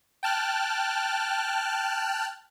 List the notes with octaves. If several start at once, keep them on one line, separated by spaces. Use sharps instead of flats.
G5 A5 F6 F#6